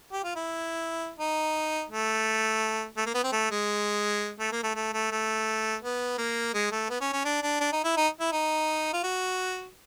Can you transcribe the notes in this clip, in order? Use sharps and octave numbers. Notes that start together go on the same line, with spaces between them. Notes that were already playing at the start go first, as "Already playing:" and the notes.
G4
F4
E4
D#4
A3
A3
A#3
B3
C4
A3
G#3
A3
A#3
A3
A3
A3
A3
B3
A#3
G#3
A3
B3
C#4
C#4
D4
D4
D4
D#4
E4
D#4
E4
D#4
F4
F#4